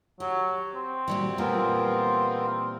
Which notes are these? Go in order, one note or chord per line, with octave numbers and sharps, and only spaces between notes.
F#3 G4
C4
A#2 F#3 G3
A#2 E3 G3 B3 F4 A#4